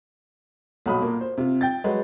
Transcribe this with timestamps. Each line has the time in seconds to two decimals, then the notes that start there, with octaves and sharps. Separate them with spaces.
0.86 B1 A#2 F#3 B5 D#6
1.02 A#2 A#3
1.21 C5
1.37 C3 F4
1.61 G5 G6 A6
1.84 F#3 G#3 B4